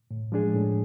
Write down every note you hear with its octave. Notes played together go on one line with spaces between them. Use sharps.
A2
F3 G#3 D4 G#4
A2